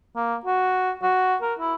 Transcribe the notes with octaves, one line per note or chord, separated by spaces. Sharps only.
A#3
F#4
F#4
A#4
E4